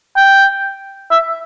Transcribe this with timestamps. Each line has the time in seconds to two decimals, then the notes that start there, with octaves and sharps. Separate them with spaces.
0.16 G5
1.11 E5